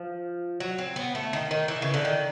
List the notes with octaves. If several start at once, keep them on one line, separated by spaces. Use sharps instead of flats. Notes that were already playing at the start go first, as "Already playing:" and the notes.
Already playing: F3
F#3
C4
B3
A3
D#3
D#3
E3
C#3
D3
D#3